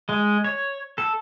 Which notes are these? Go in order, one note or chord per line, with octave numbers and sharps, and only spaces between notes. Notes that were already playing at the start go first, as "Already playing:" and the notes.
G#3
C#5
A4